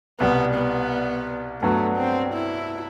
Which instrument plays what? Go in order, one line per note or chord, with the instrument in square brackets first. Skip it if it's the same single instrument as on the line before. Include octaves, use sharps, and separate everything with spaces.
[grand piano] C2 B2 G3 [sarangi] B3
[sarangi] B3
[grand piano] G2 F#3 B3 F#4 [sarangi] A3
[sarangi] C4
E4